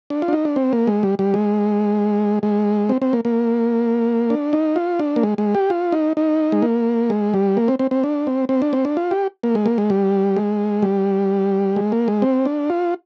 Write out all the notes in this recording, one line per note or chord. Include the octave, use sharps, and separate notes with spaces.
D4
F4
D4
D#4
D4
C4
A#3
G#3
G3
G3
G#3
G#3
C4
C4
A#3
A#3
D4
D#4
F4
D4
A#3
G#3
G#3
G4
F4
D#4
D#4
G#3
A#3
G#3
G3
A#3
C4
C4
C4
D4
C4
C4
D4
C4
D4
F4
G4
A#3
G#3
A#3
G#3
G3
G#3
G3
G#3
A#3
G#3
C4
D4
F4